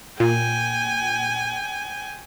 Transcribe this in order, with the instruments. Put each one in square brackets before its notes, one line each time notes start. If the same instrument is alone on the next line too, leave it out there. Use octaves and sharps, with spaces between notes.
[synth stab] A#2 [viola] G5 G#5